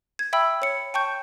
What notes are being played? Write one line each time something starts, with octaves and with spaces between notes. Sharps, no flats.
G#6
E5 G5 B5 E6
C#5 C#7
G5 A5 C#6 G6